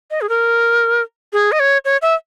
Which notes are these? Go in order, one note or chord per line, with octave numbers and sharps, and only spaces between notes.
D#5
G#4
A#4
G#4
D#5
C#5
C#5
E5